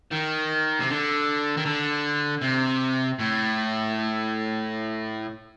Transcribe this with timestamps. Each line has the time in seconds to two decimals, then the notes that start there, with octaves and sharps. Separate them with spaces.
0.12 D#3
0.80 C3
0.89 D3
1.57 D#3
1.65 D3
2.42 C3
3.19 A2